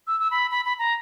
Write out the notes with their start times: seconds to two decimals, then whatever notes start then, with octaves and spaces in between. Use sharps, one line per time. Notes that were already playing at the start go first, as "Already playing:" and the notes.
0.07 E6
0.20 E6
0.31 B5
0.51 B5
0.65 B5
0.79 A#5